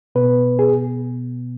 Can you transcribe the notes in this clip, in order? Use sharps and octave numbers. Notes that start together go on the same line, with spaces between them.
B2 B3 B4
G#4